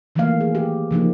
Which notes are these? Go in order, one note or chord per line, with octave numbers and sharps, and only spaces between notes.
D#3 E3 F#3 A3 A#3 F5
G#4
G4
C#3 F3 A#3 D#4